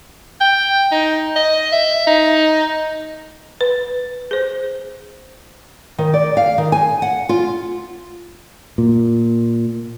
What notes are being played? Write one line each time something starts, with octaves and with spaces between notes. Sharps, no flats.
G5
D#4
D#5
E5
D#4
B4
G#4 C5
D#3
D5
F5
D#3
G#5
F#5
F4
A#2